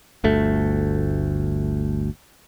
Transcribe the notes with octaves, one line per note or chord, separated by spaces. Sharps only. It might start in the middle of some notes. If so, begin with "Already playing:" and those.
G1 D2 A3